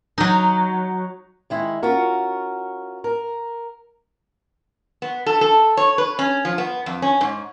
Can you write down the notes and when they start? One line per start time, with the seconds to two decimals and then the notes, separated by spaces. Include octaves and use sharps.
0.18 F#3 D#4
1.50 D#3 G#3 E4
1.83 C#4 F4 F#4 A#4
3.04 A#4
5.02 B3
5.26 A4
5.41 A4
5.77 C#5
5.98 B4
6.19 C#4
6.45 F3
6.58 B3
6.86 F2
7.02 C#4
7.21 G#2